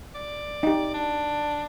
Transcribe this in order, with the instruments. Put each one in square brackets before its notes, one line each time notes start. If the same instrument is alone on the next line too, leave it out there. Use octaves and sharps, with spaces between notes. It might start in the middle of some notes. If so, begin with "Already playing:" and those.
[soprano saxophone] D5
[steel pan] D#4 G4
[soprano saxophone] D4